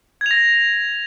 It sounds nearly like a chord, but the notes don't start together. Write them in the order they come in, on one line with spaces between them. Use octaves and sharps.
G#6 F7 A#6